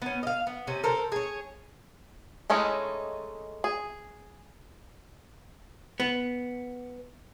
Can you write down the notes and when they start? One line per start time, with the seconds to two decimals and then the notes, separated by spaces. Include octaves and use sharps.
0.02 B3 C#4
0.23 D#5 F5
0.47 B3
0.67 C3 C#4
0.83 A4 A#4 C5
1.12 G#4 C#5
2.50 G#3 A3 C#4 D#4 E4
3.64 G#4
6.00 B3